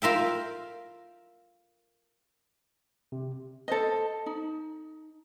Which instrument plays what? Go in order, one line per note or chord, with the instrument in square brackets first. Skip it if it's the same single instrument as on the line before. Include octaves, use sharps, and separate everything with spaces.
[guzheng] F4 A#4 E5 G5
[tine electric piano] C3
[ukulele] A4 C5 D#5
D#4